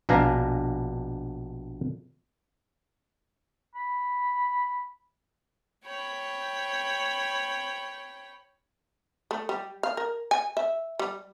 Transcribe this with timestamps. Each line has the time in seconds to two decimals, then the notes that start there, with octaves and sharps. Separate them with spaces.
0.09 A#1 B2 D4 F5 G#5 A#5
3.75 B5
5.85 C#5 G5 B5
9.31 A3
9.49 G3
9.83 F5
9.97 A#4
10.31 G#5
10.57 E5
10.99 G3